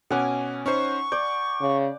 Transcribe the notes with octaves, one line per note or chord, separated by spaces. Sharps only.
B2 C#4 F#5 G#5 D6
C#4 D#4 C5 C#6
D5 G6
C#3